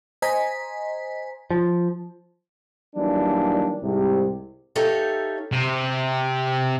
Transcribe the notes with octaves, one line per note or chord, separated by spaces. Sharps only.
C5 D#5 G#5 A#5 B6
F3
D#3 E3 F#3 G3 A#3 D4
C2 G#2 C3
D#4 G4 A4 C#5 E5 F5
C3